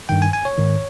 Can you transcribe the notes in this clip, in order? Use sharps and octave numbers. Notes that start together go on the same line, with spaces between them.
G2 D#3 G5
G#5
G#5
C#5
G#2 D#3